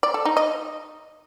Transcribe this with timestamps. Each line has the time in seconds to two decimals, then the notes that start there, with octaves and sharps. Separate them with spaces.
0.03 D5
0.14 A4
0.25 D#4
0.37 D#5